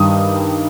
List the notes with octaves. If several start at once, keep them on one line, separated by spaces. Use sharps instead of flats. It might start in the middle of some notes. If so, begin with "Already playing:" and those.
Already playing: G2 D#3 G3 D#6